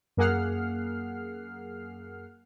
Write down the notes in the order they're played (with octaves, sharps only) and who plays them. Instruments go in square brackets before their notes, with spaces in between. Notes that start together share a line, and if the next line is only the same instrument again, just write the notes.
[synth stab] F#2 A#3 G#4 F#5 F6 C7